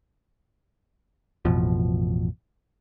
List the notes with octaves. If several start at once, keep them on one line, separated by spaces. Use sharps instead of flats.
A1 F2 B2 F3